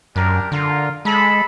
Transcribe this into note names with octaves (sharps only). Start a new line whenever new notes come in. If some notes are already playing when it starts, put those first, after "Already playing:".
F#2 D4 G4 A#4
D3 F4 A#4
G#3 A4 B5